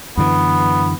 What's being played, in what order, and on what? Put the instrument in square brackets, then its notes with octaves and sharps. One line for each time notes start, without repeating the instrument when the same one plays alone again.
[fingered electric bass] F#2 D3 E3 [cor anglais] B3